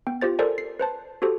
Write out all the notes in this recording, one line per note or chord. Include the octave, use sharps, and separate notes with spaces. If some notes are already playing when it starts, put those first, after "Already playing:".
B3 G5
F4 G4 C5 A6
A4 A#4 C5 D5 G#5
C7
B4 C5 A5
F#4 G4 A4 C5